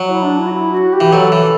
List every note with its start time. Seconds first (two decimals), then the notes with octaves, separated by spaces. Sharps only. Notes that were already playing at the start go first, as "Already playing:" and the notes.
Already playing: F#3
0.09 E4
0.23 D4
0.39 E4
0.47 F#4
0.52 E4
0.72 F#4
0.93 G4
1.00 E3
1.13 F#3 A4
1.32 E3